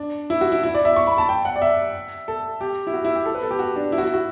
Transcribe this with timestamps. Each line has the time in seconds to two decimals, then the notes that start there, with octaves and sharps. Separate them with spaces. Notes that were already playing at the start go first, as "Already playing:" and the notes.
Already playing: D4
0.30 E4
0.41 F#4
0.52 E4
0.64 E4
0.74 D5
0.85 E5
0.96 C#6
1.07 B5
1.18 A5
1.29 G5
1.45 F#5
1.56 D5
1.62 E5
2.28 A4
2.61 G4
2.87 E4
2.94 F#4
3.05 E4
3.16 G4
3.26 A4
3.34 B4
3.43 A4
3.51 G4
3.59 F#4
3.76 D4
3.92 E4
3.98 F#4
4.03 E4
4.14 F#4